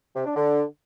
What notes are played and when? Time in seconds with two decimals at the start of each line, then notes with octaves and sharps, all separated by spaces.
0.16 C3
0.26 D4
0.36 D3